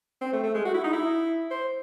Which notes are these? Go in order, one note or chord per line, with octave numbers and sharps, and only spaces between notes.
C4
A3
A3
G#3
F#4
E4
D#4
E4
C5